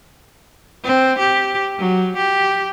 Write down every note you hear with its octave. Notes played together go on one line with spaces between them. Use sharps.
C4
G4
F#3
G4